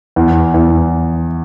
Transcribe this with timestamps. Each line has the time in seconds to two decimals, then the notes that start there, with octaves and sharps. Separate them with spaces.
0.16 E2
0.54 E2